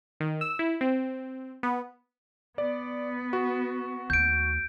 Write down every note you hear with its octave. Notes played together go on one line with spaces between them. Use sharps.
D#3
E6
E4
C4
B3
B3 D5
F#4
D#2 A3 G6 D7